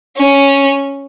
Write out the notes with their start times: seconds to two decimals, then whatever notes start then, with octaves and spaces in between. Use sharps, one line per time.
0.17 C#4